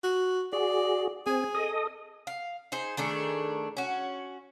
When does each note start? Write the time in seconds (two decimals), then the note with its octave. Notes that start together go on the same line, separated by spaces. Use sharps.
0.04 F#4
0.53 F#4 G#4 D5
1.26 C4 G#4 G#5
1.55 A4 D#5 D#6
2.27 F5
2.72 D#4 G#4 C5
2.97 D#3 A3 D4 G#4
3.77 C#4 F#4